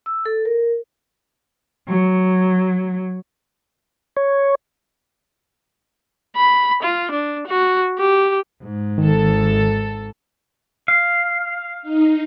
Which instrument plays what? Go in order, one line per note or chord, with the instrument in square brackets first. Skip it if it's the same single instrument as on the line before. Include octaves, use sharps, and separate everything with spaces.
[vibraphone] E6
A4
A#4
[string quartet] F#3
[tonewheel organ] C#5
[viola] B5
F4
D4
F#4
G4
[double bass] G#2
[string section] G#1 A4 [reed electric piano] D#3
[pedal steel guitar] F5
[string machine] D#4